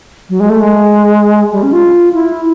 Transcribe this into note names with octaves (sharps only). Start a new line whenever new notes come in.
F#3
G#3
A3
G#3
G3
C#4
F4
E4